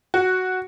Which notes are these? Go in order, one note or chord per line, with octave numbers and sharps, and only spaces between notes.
F#4